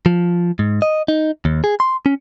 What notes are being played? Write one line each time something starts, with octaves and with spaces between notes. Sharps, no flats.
F3
G#2
D#5
D#4
D#2
G#4
C6
C#4